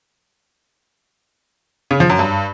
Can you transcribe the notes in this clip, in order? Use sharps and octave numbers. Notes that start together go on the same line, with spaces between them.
C#3
F3
F#2
G2